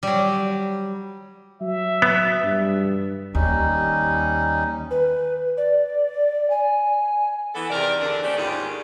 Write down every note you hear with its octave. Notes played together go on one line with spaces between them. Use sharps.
F#3 G3
F#3 E5
B3
G2
D#2 G3 C#4 D#4
B4
D5
G#5
E3 B3 A4
E2 C3 D#3 A#4 D5
E2 D3 D4
A3 C#4 D4 G4 C5 D5
D#2 G#2 D#3 F4 G4 G#4